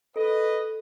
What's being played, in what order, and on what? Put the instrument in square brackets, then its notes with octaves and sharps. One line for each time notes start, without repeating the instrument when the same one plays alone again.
[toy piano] A4 [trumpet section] B4 D#5